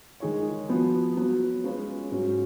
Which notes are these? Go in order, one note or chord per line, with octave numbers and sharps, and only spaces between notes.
D#3 G#3 D#4 G#4 C#5
F3 B3 F#4
F#3 B3 F#4 B4
G#3 C#4 F4 B4
G#2 F#3 C#4